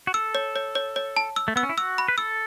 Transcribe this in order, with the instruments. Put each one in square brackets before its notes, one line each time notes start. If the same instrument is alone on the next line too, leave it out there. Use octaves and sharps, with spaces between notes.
[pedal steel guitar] F#4
[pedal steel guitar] A4 [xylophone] E6
[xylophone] C#5
C#5
C#5
C#5
A5
E6
[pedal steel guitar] A3
[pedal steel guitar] B3 [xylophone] E6
[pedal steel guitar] C#4
E4
[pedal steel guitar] F#4 [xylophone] E6
[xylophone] B5
[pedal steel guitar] B4
[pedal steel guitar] A4 [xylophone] E6